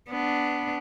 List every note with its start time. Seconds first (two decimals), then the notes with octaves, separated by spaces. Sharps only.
0.10 B3 D4